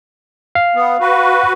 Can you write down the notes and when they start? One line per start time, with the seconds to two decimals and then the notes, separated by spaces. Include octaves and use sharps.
0.55 F5
0.75 B3
1.01 F#4 B4